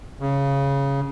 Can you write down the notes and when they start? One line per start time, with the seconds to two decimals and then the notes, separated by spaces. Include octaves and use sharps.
0.20 C#3